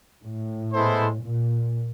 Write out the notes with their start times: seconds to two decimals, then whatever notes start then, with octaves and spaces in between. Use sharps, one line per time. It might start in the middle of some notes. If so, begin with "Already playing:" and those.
0.23 A2
0.72 G#3 B3 E4 A4 C5
1.22 A#2